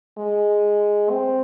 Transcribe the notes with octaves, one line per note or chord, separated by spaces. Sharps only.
G#3
C4